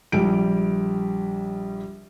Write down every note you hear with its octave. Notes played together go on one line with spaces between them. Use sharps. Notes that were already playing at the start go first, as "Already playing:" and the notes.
A#1 G3 D7